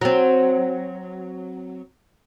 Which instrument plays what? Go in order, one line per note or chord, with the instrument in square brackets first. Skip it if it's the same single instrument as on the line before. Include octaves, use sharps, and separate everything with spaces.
[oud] F#3 C4